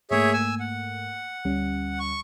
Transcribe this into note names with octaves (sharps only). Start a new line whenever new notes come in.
G#2 A3 A#3 G#4 C#5 E5
G#5 E6
F#5
D2 G3 C#4
C#6